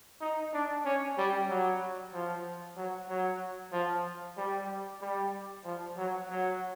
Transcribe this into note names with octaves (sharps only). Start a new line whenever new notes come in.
D#4
D4
C#4
G3
F#3
F3
F#3
F#3
F3
G3
G3
F3
F#3
F#3